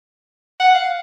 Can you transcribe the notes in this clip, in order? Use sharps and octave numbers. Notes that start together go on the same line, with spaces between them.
F#5
F5